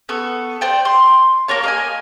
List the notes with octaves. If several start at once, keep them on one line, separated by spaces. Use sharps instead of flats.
B3 A4 C#6
C5 D5 G5
C6
A#3 A#4 C#5 A5
A#3 D#5 G#5